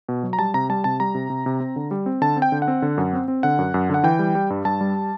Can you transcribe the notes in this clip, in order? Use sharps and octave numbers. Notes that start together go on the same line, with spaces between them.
B2
F#3
A#5
G3 A5
C3 A#5
G3 A5
C3 A5
G3 A#5
C3
C3
C3
C4
D3
G3
C4
D3 A5
C4
G5
D3
F#5
C4
D3
F#2
C4
C4
D3 F#5
F#2
F#2
D3 F#5
E3 G5
G3
G3
G2
G2 A5
G3